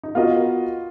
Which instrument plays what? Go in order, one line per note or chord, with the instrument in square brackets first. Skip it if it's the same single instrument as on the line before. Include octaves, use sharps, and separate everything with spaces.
[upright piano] D#4
[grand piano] B3 F#4 A#4 D#5 [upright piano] F4